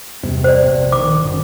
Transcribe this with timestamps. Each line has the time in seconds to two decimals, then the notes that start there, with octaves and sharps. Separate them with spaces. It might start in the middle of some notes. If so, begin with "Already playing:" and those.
0.23 E2 G2 C3 B3
0.44 C5 D5
0.64 A#1
0.92 D#3 D6
1.23 G1 F#2 D#3